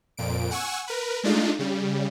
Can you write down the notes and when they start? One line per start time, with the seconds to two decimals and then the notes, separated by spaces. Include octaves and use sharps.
0.17 F2 A#2 D7
0.51 F#5 G#5 C#6 E6
0.87 A#4 B4
1.23 G#3 A3 D4 D#4 F4
1.59 C#3 G3